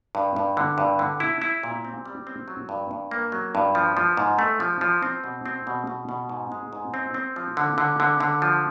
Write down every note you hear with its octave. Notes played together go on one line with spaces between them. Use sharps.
G2
G2
D3
G2
D3
E4
E4
A#2
C4
G3
C4
F#3
G2
G2
A#3
F#3
G2
F3
F3
G#2
A3
F3
F3
C4
B2
C4
B2
B2
B2
G#2
G#3
G#2
C4
C4
F3
D3
D3
D3
D3
F3